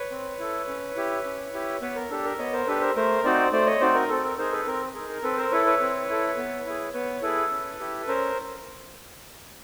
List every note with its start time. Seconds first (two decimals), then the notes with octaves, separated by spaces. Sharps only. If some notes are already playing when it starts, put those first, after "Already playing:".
Already playing: B4 C#5
0.11 C4
0.39 E4 A4
0.68 C#4
0.96 E4 G4
1.25 C#4
1.53 E4 G4
1.82 B3 B4 C#5
1.96 A#4
2.10 D4 G4 A4
2.25 A#4
2.38 B3 C#5 D#5
2.53 A#4 C5
2.67 D4 G4 A4 B4
2.81 A#4 C5
2.96 A3 A#4 C5
3.24 C4 D#4 F#4 C5 D5
3.52 A3 C5 D5
3.67 C#5 D#5
3.81 C4 D#4 F#4 C5 D5
3.95 A#4
4.09 C4 A4
4.24 A#4
4.38 D#4 G#4 A#4 C5
4.52 A4 B4
4.66 C4 A#4
4.95 D#4 G#4 A#4
5.09 A#4
5.23 C4 A4 B4
5.37 A#4 C5
5.51 E4 A4 B4 C#5
5.66 B4 C#5
5.81 C4
6.09 E4 A4
6.37 B3
6.66 E4 G#4
6.94 B3 B4 C#5
7.22 E4 G#4 A4 B4
7.51 C#4
7.80 E4 G4
8.07 C#4 A#4 C5